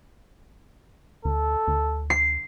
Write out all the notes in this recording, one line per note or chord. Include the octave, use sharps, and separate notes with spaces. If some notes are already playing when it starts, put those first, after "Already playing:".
D2 A4
D2
C7